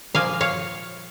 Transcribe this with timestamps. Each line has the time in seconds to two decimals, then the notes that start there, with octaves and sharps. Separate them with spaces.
0.15 A#2 F3 A#3 F5 G#5
0.41 C#5 F5